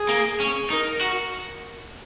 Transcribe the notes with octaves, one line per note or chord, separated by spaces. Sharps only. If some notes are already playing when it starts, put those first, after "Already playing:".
Already playing: G#4
A#3
C#4
D#4 A#4
F#4